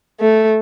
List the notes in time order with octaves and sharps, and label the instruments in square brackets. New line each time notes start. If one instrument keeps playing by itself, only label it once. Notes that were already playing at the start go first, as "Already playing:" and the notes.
[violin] A3